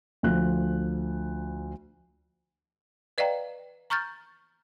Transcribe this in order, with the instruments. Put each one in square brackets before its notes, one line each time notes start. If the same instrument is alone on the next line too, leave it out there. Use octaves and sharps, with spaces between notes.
[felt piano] D2 F3 F#6
[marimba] B4 D5 D#5 F5 G5 A#5
A#5 C#6 F6 G6 A6